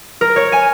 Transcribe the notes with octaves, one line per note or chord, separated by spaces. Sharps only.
A#4
C#5
G#5